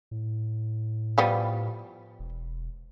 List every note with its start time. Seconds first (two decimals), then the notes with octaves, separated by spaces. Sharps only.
0.11 A2
1.18 F3 G3 B3
2.19 E1